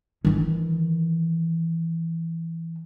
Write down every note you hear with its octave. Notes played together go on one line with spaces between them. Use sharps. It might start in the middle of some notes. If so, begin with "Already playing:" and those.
D#3 E3